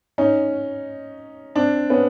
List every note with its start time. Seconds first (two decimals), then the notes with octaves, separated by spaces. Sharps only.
0.18 C#4 D#4
1.56 C4 D4
1.90 B3 C#4